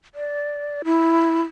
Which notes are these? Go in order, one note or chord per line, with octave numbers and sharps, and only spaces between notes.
D5
E4